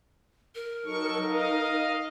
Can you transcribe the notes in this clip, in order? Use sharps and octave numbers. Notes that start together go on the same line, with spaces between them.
A#4
F#3 D#4 A4 C#6
D#5 F5